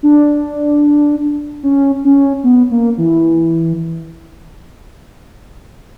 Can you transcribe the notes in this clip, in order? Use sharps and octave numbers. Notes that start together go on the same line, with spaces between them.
D4
C#4
C#4
B3
A#3
E3